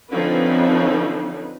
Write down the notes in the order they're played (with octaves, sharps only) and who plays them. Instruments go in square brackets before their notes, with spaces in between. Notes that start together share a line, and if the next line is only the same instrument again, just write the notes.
[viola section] D3 F3 C4 C#4 D#4 B4